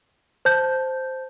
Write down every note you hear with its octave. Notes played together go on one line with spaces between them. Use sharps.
C5 A5 G6